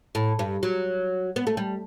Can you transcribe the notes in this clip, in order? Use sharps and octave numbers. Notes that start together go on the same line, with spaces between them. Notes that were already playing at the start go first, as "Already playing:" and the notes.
A2
G2
F#3
B3
A3
G3